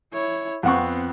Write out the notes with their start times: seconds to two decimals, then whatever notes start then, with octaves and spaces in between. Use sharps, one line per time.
0.13 E4 C#5
0.63 F2 B3 C4 F#5 C#6